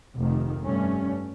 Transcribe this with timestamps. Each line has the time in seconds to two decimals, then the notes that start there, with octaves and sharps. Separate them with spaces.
0.18 F1 D#3
0.62 F1 G2 A3 C#4